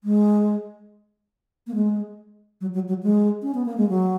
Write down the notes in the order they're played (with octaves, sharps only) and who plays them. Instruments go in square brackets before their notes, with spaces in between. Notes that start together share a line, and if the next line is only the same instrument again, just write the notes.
[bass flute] G#3
A#3
G#3
F#3
F#3
F#3
G#3
C#4
B3
A#3
G#3
F#3